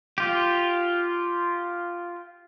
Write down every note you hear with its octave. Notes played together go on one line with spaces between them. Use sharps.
F4 G4